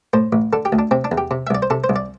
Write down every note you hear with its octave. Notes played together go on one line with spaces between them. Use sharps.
A2 C5
A1
D3 A4
G4
D2
D4
C3 C4
D4
E2
G4
C3
E5
C2 D5
C5
C3 A4
C5
C2
D5